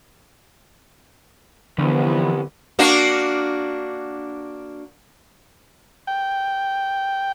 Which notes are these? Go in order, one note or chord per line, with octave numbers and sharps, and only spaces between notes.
C2 D3 E3 F3 B3
A#3 D4 F#4
G5